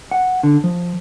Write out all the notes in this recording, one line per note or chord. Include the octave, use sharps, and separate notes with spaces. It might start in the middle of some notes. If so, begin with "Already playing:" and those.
F#5
D3
F3